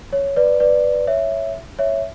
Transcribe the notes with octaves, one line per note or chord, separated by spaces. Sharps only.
C#5
B4 D5
B4 D5
C#5 E5
C#5 E5